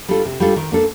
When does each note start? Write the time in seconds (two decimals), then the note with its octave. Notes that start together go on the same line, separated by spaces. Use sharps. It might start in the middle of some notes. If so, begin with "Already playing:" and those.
0.09 G3 D4 F4 A4
0.25 C3
0.40 G3 D4 F4 A4
0.56 D#3
0.72 A#3 D4 A4